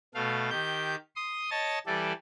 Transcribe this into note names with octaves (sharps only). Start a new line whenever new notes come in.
B2 A3 F5
D#3 G4 G6
C6 D#6
C#5 D#5 A5 A6
E3 G3 A4 D5